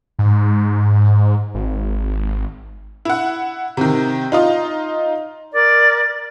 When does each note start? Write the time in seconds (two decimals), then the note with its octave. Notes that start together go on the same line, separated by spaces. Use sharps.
0.19 G#2
1.54 G#1
3.05 E4 F#5
3.77 C3 D#3
4.32 D#4 F4 D#5
5.53 A#4 D5